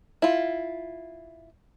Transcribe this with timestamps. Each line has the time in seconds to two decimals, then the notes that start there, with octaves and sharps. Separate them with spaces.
0.22 E4 F4